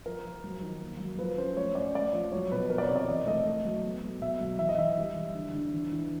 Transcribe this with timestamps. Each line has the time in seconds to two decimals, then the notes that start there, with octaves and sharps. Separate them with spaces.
0.06 F3 A#4
0.25 F3
0.44 F#3
0.62 D#3
0.81 A#3
1.00 F#3
1.19 F3 B4
1.38 C#4 C5
1.57 A3 C#5
1.75 C#4 D5
1.95 A3 D5
2.13 F3
2.32 F#3 C#5
2.51 B2 B4
2.70 F3 A#4
2.78 D5
2.83 C#5
2.89 C3
2.96 D5
3.08 E3 D#5
3.26 A3 D#5
3.45 A3
3.65 F#3
3.84 B3
4.03 F#3
4.21 B2 E5
4.40 F#3
4.59 E3 E5
4.69 D#5
4.78 E3 E5
4.97 G3
5.16 E3
5.35 D3
5.53 D3
5.72 E3
5.92 E3